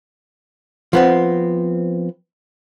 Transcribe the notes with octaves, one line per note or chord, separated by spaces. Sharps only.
F3 B3 C4